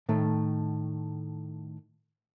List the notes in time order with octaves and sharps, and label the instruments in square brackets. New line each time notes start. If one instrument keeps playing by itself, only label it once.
[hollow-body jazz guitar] A2 D#3 A3